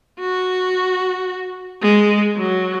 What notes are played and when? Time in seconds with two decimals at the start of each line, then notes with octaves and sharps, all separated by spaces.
0.20 F#4
1.82 G#3
2.37 F#3